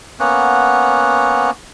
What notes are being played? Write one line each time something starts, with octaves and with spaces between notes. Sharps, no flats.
A#3 B3 C#4 F#5